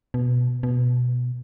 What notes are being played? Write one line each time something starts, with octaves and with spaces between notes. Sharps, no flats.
B2
B2